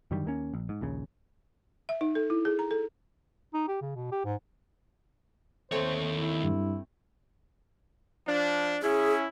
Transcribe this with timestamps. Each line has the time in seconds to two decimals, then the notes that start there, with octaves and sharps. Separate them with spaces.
0.11 F#2 D3 D#3 G3
0.25 D#2 A#3 C#4
0.54 A#1
0.69 G#2
0.81 A#1 D#2 C#3
1.89 E5
2.01 D#4
2.15 A4
2.30 E4
2.45 G#4
2.59 A#5
2.71 A4
3.54 D#4
3.68 G4
3.81 C#3
3.95 B2
4.12 G4
4.25 G#2
5.72 D#2 A3 C4 C5 C#5
6.12 E4
6.43 G2
8.27 F3 D4
8.82 C#4 E4 G#4